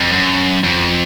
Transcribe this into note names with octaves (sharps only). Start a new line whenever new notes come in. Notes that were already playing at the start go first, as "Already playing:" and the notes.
F2
F#2
F2